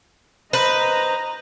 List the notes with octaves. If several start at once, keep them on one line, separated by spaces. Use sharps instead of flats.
B4 C5 D#5 A#5